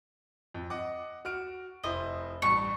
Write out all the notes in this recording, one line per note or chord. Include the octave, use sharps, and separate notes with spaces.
F2
D#5 F#5 D6
F#4 F6 D7
F1 E4 C5 D#5
A1 G2 C#6